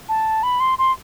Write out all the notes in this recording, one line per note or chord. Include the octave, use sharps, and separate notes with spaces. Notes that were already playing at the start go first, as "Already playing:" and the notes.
A5
B5
C6
C6